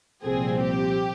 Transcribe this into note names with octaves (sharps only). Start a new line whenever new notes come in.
C2 A#2 F3 C4 G#4
G4